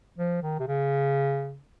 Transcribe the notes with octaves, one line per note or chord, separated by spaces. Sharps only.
F3
D#3
C3
C#3